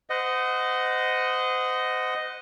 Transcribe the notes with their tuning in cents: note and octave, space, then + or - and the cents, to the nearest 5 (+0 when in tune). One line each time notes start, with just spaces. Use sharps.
C5 -30 D#5 +0 F#5 +0